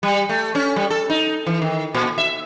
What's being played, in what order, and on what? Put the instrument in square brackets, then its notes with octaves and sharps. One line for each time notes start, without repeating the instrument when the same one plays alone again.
[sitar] G3
A3
C#4
G3
A4
D#4
E3
D#3
A#2
E5